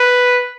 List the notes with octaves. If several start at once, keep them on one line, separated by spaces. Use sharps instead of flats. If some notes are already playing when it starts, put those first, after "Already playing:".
Already playing: B4